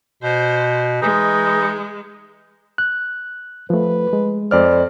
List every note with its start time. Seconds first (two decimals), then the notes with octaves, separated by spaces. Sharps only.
0.23 B2 C5
1.02 E3 G#3 D#4
2.78 F#6
3.70 F3 A3 B4
4.13 G#3
4.51 F2 C5 D5 F6